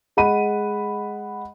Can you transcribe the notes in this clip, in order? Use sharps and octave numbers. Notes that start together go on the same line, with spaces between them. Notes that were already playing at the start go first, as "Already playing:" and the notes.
G#3 D#5 F#5 B5 D#7